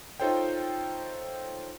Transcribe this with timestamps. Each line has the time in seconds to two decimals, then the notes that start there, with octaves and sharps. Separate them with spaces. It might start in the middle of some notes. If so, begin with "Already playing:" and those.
0.20 D#4 F4 A4 C5 C#5 G5